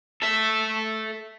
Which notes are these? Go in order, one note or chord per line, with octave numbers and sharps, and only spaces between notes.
A4 E5